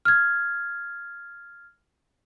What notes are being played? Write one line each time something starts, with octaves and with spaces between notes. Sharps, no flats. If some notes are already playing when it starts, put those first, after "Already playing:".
F6 G#6